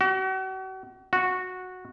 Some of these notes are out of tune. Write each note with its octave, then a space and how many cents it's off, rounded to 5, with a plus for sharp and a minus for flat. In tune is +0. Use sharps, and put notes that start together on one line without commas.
F#4 +40
F#4 -10